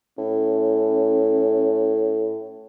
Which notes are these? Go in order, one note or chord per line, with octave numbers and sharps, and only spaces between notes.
A2 C#4